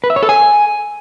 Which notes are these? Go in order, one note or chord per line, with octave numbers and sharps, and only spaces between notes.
B4
E5
C#5
A4
G#5